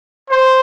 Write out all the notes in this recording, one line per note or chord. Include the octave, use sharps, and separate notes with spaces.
C5